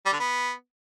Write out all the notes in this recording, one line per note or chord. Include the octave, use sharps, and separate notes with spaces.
G3
D3
B3